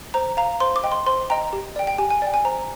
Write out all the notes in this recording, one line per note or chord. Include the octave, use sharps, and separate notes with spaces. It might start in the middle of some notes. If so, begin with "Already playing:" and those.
C5 A#5
F5 A#5
C5 C6
D6
D#5 G5
C6
C5 C6
D#5 G5 A#5
G4
D5 G5
G5
G4 G#5
G#5
D5 G5
G#5
C5 A#5